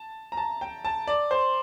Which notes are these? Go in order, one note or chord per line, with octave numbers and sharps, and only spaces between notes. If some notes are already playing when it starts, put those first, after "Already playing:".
Already playing: A5
A#5
A5
G5
A5
D5
C5